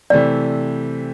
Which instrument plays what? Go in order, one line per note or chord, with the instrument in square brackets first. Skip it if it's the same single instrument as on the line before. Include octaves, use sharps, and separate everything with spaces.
[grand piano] C3 E3 A3 C4 [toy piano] D5